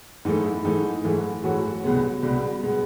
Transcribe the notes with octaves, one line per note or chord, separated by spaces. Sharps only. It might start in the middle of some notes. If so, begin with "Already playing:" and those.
G#2 E3 A3 D#4
E4
G#2 E3 A3 D#4
G#2 E3 A3 E4
G#2 E3 F#3 A3 F#4
C2 B2 G#3 B3
C2 B2 G3 G#3 B3 G4
B2 G#3 B3